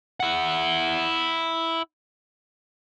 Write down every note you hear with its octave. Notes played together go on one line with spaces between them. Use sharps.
E4 F#5